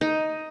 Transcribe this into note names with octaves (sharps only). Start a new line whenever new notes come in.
D#4